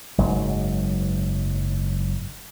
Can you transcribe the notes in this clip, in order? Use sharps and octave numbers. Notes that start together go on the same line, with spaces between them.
F#1 G#2 F#3